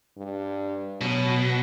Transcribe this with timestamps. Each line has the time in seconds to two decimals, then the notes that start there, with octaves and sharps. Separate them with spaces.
0.18 G2
1.01 B2 F#3